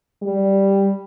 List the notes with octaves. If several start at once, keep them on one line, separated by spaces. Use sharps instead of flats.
G3